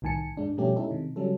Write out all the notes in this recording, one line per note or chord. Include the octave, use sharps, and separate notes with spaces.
C2 A2 D#3 G#5 A5 C#7
G#2 G#3 D4
B2 F3 G3 A3 C#4 G4
G#3 C#4 D#4 E4 A4
C3 D#3
C#3 F#3 G3 C#4 A4